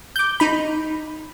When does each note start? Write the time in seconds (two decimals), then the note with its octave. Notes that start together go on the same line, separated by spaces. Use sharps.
0.16 D6 G6
0.40 D#4 B5